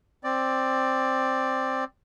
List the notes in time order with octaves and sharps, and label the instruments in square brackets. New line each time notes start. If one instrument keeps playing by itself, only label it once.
[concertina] C4 D5